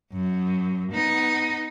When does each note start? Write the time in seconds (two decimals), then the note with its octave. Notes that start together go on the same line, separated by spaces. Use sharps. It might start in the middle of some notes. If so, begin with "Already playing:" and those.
0.13 F#2
0.92 B3 D#4